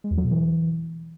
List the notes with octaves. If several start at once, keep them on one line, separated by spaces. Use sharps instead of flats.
G#3
E2
F#3
B2
E3